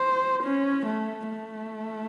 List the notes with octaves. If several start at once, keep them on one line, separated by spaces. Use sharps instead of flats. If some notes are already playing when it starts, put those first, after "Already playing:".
Already playing: C5
C#4
A3
A3